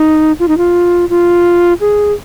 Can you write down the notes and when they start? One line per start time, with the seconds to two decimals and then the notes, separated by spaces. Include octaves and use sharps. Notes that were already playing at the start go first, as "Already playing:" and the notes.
Already playing: D#4
0.39 F4
0.48 D#4
0.58 F4
1.10 F4
1.81 G#4